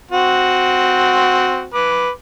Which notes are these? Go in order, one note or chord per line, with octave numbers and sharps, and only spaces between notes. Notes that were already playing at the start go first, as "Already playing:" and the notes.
C4 F#4
B4 D6